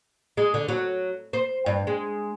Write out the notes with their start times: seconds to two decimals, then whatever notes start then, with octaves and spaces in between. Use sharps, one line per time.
0.37 G#3
0.54 D3
0.68 F#3
1.33 C5
1.66 G2
1.87 G#3